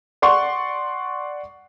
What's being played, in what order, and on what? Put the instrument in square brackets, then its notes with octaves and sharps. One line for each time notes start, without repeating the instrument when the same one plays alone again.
[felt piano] D5 F#5 C6 C#6